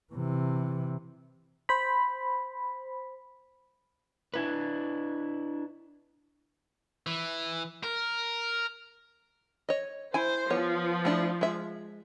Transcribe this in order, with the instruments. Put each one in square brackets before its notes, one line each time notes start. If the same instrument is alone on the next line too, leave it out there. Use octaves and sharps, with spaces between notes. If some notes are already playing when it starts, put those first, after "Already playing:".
[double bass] C3 E3
[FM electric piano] C5 B5
[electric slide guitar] D4 E4 B4
[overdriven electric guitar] E3
A#4
[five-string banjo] C#5 D#5
[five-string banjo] E4 G#5 [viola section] C5
[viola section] F3 [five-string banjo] B3 C#5
[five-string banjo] A3 D4 E4
G#3 E5